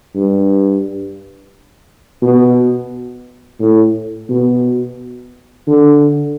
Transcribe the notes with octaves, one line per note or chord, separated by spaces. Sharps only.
G2
B2
A2
B2
D3